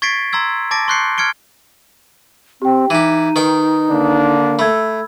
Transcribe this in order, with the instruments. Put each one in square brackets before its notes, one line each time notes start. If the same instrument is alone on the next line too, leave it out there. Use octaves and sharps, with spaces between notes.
[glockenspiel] C#6 G#6 A6 B6 C7 D7
A#5 C6 E6 G#6
A5 D6 A6 A#6 D7
C6 C#6 F#6 G6 C7 C#7
F6 G#6 C#7 D7 G7
[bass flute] C4 [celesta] G4 G5
[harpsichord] E3 G4 [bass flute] D#4 [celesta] D#7
[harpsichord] D#3 G5 C#6 [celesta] B4 D#6
[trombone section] D3 A#3 D4
[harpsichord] A3 [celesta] B5 E6 G#6